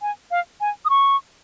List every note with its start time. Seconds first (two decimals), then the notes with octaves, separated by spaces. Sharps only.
0.02 G#5
0.31 F5
0.61 G#5
0.85 D#6
0.90 C#6